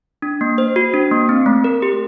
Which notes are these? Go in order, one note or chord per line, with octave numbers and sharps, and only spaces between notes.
D4
A#3
C5
F#4
D4
A#3
C4
A3
A#4
G4